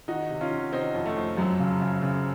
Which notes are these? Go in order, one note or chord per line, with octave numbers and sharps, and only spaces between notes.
D#3 D#4 F#4
C3
C#4 F4
D#3
C3 C4 D#4
F2
A3
F2
F#2 F#3
C#3
C#3
C#3